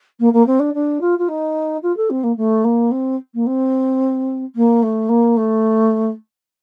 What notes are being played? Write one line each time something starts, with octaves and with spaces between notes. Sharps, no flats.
A#3
A#3
C4
D4
D4
F4
F4
D#4
F4
A4
C4
A#3
A3
A#3
C4
A#3
C4
A#3
A3
A#3
A3